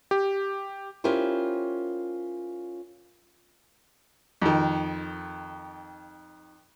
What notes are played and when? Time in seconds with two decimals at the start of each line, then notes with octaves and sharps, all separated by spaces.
0.11 G4
1.04 C#4 E4 F4 G4 A#4 C5
4.42 F2 D#3